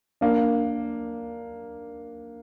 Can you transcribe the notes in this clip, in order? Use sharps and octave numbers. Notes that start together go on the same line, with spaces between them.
A#3 D4